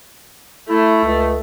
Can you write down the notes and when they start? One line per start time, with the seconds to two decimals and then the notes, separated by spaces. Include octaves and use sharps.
0.69 A3 E4
1.04 C#2